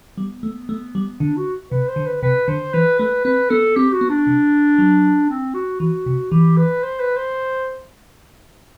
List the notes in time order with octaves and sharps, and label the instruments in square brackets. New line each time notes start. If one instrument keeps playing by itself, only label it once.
[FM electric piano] G3 [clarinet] B3
[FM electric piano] A3
A3
G3
[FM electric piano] D3 [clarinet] D4
[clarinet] F#4
[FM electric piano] C3 [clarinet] B4
[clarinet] C5
[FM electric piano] D3
[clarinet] B4
[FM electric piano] C3 [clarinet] B4
[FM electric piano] D3 [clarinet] C5
[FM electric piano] E3 [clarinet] B4
[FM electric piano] A3 [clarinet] B4
[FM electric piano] C4 [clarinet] B4
[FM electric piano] B3 [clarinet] A4
[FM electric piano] C4 [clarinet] G4
[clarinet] F#4
[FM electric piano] B3
[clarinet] D4
[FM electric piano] C3
F#3
[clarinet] C4
F#4
[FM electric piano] E3 [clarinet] F#4
[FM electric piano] C3
[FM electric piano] E3 [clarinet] G4
[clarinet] B4
C5
B4
C5